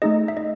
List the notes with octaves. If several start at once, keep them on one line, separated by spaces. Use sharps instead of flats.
A3 D#4 G#4 D#5
E5
D#5